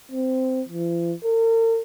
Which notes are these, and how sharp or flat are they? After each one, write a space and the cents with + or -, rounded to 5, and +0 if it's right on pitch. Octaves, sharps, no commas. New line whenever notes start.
C4 -15
F3 -45
A#4 -45